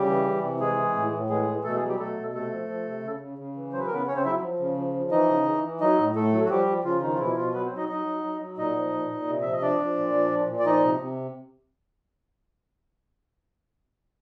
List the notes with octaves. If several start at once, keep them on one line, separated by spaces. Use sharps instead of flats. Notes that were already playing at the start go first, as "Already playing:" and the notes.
Already playing: C#3 G3 G4
E3
E3
C3
E3 G#3 G#4
E3
A2
A2
E3 G#3 G#4
E3
B2 A3 A4
G#3 G#4
F#3
G3 G4
B2 A3 A4
B2
C3 A3 A4
F3
F3
C3
C#3
C#3
C#3
E3
F#3 C5
B4
A#4
C#3 B3 B4
C#3 C#4 C#5
C4 C5
F#3 E4 E5
F3
C#3
F3
F3
E3 D#4 D#5
C#3
E3
E3
F#3 D#4 D#5
A2
A2 A3 A4
F#3
F#4
F3 G3 G4
F3
C#3 F3 F4
D#3 F3 D#4
F4
B2 E3 E4
B2 F3 F4
F#3 B3 B4
C4 C5
F#3
D#4 D#5
F#3 D#4 D#5
F#3
F#3
F#3
A#2 D#4 D#5
F3
A#2
A#2
C3
F3 E5
D#5
F3 D4 D5
F3
A#2
F3
A#2
A#2
D5
F3 D#4 D#5
C3
C3